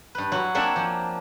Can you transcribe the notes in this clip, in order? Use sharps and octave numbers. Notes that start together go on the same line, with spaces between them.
G2 B4
F#3 E4 F#4
A#3 C4 D4 E5 F#5 G#5
F3